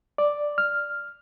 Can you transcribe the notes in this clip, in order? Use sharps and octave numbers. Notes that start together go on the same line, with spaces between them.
D5
F6